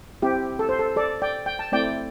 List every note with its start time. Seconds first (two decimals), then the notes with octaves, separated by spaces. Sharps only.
0.22 C4 E4 G4
0.59 A4
0.69 C5
0.79 A4
0.96 A4 D5
1.22 D5 G5
1.46 G5
1.59 A5
1.72 A3 C4 E4 D5 G5